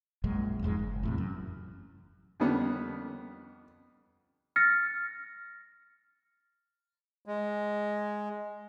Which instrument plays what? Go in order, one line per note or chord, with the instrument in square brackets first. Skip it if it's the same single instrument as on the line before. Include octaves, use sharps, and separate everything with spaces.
[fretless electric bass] A#1 F#2 A#2 G#3
E1 F2 G#2 G#3
F#1
E2 A2 C3
F#2
[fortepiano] F2 D3 D#3 G3 B3 C#4
[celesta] F6 A6 A#6 C#7
[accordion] G#3